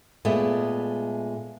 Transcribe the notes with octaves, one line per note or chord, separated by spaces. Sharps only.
A#2 G#3 A3 B3